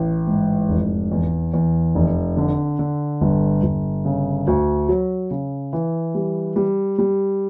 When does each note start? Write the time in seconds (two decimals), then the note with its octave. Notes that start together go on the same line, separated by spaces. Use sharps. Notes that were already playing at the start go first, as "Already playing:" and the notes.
Already playing: A1
0.27 G#2
0.69 F1
1.12 E2
1.54 E2
1.95 F1
2.37 D3
2.79 D3
3.21 G1
3.63 G1
4.05 C#3
4.47 D2
4.89 F#3
5.31 C#3
5.73 E3
6.15 G3
6.56 G3
6.98 G3